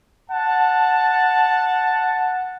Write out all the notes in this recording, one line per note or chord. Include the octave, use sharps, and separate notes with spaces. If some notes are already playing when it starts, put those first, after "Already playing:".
F#5 A5